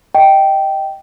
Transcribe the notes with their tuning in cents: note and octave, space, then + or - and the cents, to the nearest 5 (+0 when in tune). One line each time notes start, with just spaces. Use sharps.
D#5 +10 G5 -10